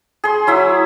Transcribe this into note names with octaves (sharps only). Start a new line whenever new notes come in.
G#4 C6
F#3 E4 E5